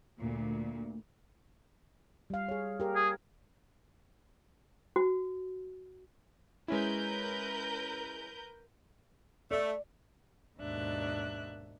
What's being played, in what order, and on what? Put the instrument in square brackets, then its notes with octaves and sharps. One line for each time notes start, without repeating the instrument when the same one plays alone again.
[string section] D2 A#2
[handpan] G3 F5
G#4 C#5
G4 A#4
[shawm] G#4
[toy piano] F#4
[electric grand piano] G#3 C#4 E4 [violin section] A#4 B4 G6
[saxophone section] A3 [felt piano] D5
[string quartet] D#2 G#2 B2 D4 E5 F#6